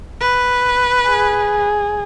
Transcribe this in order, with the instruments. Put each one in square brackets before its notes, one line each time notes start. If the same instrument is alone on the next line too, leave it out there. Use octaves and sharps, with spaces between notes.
[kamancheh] B4
[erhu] G#4